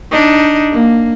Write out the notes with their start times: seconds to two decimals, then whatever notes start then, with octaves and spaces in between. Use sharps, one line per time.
0.11 D4 D#4
0.71 A#3